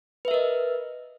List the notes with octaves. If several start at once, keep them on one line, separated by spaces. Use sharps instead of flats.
A#4 B4 D#5 E5